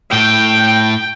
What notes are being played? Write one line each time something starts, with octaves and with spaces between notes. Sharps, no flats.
A2 G5